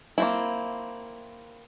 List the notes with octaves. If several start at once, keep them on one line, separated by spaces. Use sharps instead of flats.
A#3 C4 E4